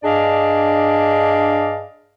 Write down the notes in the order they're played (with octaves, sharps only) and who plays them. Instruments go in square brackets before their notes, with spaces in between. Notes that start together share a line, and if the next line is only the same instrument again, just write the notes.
[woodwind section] G2 D4 G#4 D5 D#5 F5